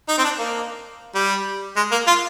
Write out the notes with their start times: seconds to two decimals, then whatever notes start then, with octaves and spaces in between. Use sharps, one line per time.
0.08 D#4
0.18 C4
0.24 D4
0.39 A#3
1.15 G3
1.76 G#3
1.92 A#3
2.07 F4